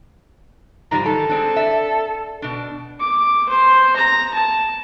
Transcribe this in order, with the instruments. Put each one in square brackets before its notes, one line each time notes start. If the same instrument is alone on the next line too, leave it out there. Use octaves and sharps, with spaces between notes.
[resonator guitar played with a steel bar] G#2 F3 G3 [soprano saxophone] A#5
[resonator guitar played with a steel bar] D#3 [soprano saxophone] A4
[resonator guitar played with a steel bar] G#3 C4 D4
D5 E5
B2 D4
[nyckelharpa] D6
C5
A#5
A5